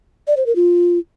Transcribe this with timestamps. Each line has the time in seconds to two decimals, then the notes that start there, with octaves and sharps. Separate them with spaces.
0.27 D5
0.37 C5
0.46 A#4
0.56 F4